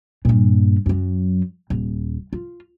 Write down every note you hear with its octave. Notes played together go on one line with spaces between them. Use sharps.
G2 A#2
F#2 F#3
D#1
F4